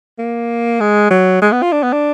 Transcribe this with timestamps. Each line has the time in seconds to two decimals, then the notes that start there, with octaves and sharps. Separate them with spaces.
0.19 A#3
0.80 G#3
1.11 F#3
1.42 G#3
1.52 B3
1.62 F4
1.72 D4
1.83 B3
1.93 D4